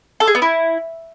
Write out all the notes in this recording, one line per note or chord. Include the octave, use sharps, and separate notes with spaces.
A4
G#4
B3
E4